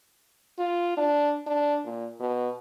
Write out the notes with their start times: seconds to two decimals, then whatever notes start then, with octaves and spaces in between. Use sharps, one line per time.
0.58 F4
0.97 D4
1.47 D4
1.85 A#2
2.20 B2